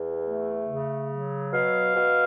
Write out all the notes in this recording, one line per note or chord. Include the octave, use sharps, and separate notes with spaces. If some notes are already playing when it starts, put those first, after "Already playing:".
Already playing: E2
A3
C#3
F#3
B2 F5
B2